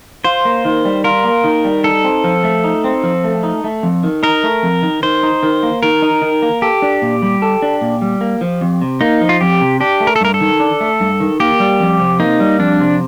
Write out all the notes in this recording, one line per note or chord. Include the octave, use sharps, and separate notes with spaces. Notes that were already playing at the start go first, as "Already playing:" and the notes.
F4 C5
A#3
D#3
G3
F4 A#4
A#3
D#3
G3
D#4 A4
C4
F3
A3
D#4
C4
F3
A3
D#4
A3
F2
D#3
D#4 A#4
A3
F2
D#3
D#3 C5
D#4
D#3
A#3
D#3 A#4
D#4
D#3
A#3
G4 A4
D4
A#2
G3
A4
D4
A#2
G3
A#3
F3
F2
C3
A#3 D#4
F3
F4
F2 G4
C3
D4 G4
A3
A#4
A4
G2 A#4
A4
D#3
D4
A3
G2
D#3
A#3 G4
G3
F2
C3
A#3 D#4
G3
F2 D4
C3